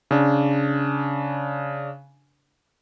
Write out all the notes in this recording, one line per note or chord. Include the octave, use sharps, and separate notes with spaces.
C#3 D4